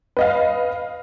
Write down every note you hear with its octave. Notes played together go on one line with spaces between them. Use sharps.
B4 D#5 F5